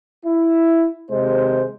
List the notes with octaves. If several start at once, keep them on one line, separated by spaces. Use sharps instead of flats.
E4
D#2 C3 G#3 C5